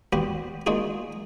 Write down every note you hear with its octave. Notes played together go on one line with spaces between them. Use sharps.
B3 C4 F#4 G4 B4
G#3 A#3 D#4 F4 F#4 G#4